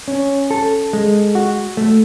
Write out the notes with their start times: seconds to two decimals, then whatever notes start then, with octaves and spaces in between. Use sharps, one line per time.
0.08 C#4
0.51 A4
0.93 G#3
1.35 F#4
1.77 A3